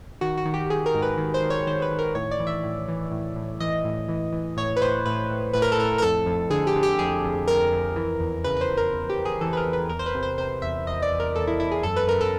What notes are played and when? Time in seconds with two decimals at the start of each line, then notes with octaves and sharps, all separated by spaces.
0.21 D#3 F#4
0.38 F#4
0.45 D#3
0.54 G4
0.70 D#3 G#4
0.86 A#4
0.94 G#2
1.02 B4
1.18 D#3
1.34 C5
1.42 D#3
1.50 C#5
1.67 D#3 C5
1.82 B4
1.91 D#3
1.99 A#4
2.15 A2 C#5
2.31 D5
2.40 E3
2.47 E5
2.64 A2
2.88 E3
3.11 A2
3.36 A2
3.60 E3 D#5
3.84 A2
4.09 E3
4.32 E3
4.57 A2 C#5
4.76 B4
4.82 A2 C5
5.06 A2 B4
5.30 A2
5.53 A2 B4
5.62 A#4
5.72 A4
5.78 A2 A#4
5.98 A#4
6.02 F2 A4
6.26 F2
6.50 D3 G#4
6.67 G4
6.76 D3
6.83 G4
6.99 F2 G#4
7.24 F2
7.47 F2 A#4
7.72 F2
7.96 E3
8.20 E2
8.44 C#3 B4
8.57 B4
8.61 C5
8.69 E2
8.77 A#4
8.93 E2
9.10 G4
9.17 E2
9.25 G#4
9.41 E3 A4
9.53 B4
9.57 A#4
9.66 E2
9.73 B4
9.89 E2 A#4
9.99 C5
10.06 B4
10.15 C3
10.23 C5
10.38 C3 C5
10.62 E2 E5
10.87 E2 D#5
11.02 D5
11.11 E2
11.20 A#4
11.35 E2 A4
11.47 E4
11.60 E2 E4
11.71 G#4
11.83 F#2 A4
11.96 B4
12.07 F#2 A#4
12.21 A4